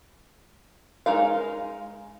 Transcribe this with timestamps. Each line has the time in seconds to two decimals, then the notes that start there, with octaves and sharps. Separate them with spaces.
1.06 G#3 D#4 A#4 F5